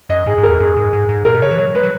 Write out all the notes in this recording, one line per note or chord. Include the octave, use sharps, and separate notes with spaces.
F#2 D#5
G#2 G#4
G#2
A#4
E2
F#2 G#4
G#2
G#2
G#2
A#2 A#4
B2
C#3 C#5
E3
F#3 C#5
G#3 B4
F#3